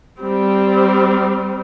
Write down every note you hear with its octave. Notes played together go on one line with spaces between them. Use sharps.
G3 C4